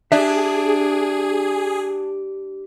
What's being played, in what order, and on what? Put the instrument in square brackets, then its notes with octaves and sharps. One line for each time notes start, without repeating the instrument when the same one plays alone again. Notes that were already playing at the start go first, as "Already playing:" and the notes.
[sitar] D4 [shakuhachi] G4 [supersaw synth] G#4 [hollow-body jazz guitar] E5